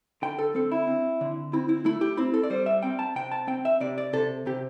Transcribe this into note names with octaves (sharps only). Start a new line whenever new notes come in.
D3 G5
A4
C4 A4
E4
C4
D3
C4 E4
E4
A3 E4
G4
C4 E4
A4
D5
G3 C5
E5
C4 G5
A5
C3 G5
A5
C4 G5
E5
C3 D5
D5
C3 A4
C3 G4